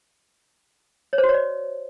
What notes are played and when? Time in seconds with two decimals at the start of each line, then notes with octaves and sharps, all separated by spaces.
1.13 C#5
1.18 C5
1.23 F#4
1.29 C#5
1.34 D5